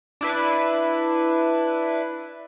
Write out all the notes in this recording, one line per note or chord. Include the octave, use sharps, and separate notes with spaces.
D4 E4 B4